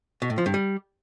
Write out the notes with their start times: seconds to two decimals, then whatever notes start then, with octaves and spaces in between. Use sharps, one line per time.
0.22 B2
0.30 A2
0.38 F3
0.46 G2
0.54 G3